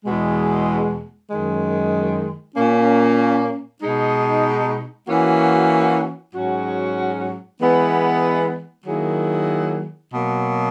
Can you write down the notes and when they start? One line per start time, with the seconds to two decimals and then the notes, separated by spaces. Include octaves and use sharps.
0.05 E2 B2 G#3
1.31 F#2 D#3 G#3
2.56 A#2 A#3 C#4
3.82 B2 G#3 D#4
5.08 E3 A#3 C#4 F#4
6.34 G#2 F#3 C#4 F#4
7.59 E3 G#3 B3
8.86 D#3 F#3 A#3 E4 G#4
10.12 B2 F#3 A#3